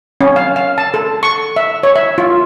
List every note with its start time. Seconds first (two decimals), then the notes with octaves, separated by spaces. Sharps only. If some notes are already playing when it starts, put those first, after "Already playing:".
0.21 C#4
0.36 F5
0.56 F5
0.78 A5
0.94 A4
1.23 C#6
1.56 E5
1.83 C#5
1.96 E5
2.18 F4